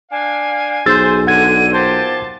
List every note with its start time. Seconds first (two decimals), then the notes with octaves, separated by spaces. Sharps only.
0.11 D4 F5 G#5
0.86 B1 G#4 C5 E6 A6
1.27 D3 F#5 G#6 D#7
1.73 A#2 G4 C5 A5